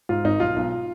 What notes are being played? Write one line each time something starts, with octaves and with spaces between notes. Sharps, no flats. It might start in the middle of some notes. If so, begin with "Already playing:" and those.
G#2 F4
G#1 D#4
B1 F4
B1